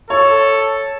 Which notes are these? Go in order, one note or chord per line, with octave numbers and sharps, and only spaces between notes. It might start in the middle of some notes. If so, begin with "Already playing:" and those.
A4 C#5